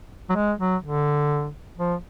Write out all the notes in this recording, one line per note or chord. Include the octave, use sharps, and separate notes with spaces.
F#3
G#3
F#3
D3
F3